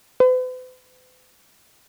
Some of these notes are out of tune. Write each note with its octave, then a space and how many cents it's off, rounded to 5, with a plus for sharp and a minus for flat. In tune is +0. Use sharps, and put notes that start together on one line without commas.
B4 +45